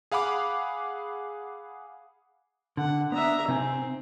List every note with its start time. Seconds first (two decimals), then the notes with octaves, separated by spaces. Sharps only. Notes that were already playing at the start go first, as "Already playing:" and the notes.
0.12 G#4 F5 F#5 B5 D6
2.77 D3 F#5
3.12 B3 D4 E5 A#5
3.48 C3 C4 D#4 G#5